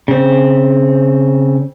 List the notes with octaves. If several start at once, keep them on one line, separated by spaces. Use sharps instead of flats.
C#3 C4